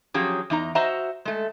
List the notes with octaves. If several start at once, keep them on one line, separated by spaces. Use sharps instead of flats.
F3 F#3 C#4 G4 G#4
E2 D#4 A#5
F#4 C5 D#5 E5 F#5 A#5
G#3 A3